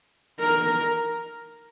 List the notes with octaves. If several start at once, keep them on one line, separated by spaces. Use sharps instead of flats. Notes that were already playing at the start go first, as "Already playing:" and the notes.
A#4